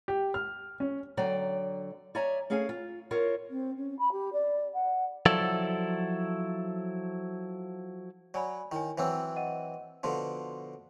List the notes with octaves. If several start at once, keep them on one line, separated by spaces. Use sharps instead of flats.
G4
F6
C#4
D3 F#3 D5 G5 A#5
C#5 D5 E5 G#5 A#5
A3 C#4 G#4 F5 G#5
F4
F4 A#4 C#5 E5
C4
C#4
B5
G4
D5
F#5
F3 F#3 E4 A4 D5
F#3 D5 G#5 B5
D#3 E4 C#5 G#5
E3 F#3 C4 C5 E6
D#5 F#5 D#7
B2 D3 F3 F#4 A5 C6